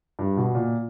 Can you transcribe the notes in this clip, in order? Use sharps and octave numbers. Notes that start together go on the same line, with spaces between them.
G2
B2
A#2